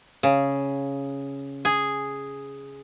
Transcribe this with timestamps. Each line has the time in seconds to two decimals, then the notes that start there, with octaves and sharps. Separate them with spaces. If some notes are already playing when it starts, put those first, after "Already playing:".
0.23 C#3
1.65 G#4